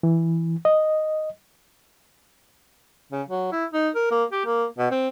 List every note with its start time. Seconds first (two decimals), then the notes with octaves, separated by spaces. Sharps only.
0.03 E3
0.65 D#5
3.12 C#3
3.28 F#3
3.52 E4
3.72 D#4
3.95 A#4
4.11 A#3
4.32 G4
4.45 A#3
4.78 B2
4.91 C4